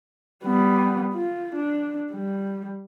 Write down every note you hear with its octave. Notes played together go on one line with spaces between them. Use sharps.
G3 B3
F4
D4
G3